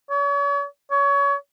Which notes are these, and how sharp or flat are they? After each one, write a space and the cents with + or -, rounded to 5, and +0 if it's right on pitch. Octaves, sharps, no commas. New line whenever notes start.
C#5 +40
C#5 +25